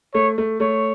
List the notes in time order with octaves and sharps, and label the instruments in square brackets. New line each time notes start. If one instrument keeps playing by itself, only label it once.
[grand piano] A3 [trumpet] C#5
[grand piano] A3
[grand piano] A3 [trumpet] C#5